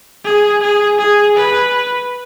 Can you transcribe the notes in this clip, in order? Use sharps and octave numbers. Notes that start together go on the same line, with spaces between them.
G#4
G#4
G#4
B4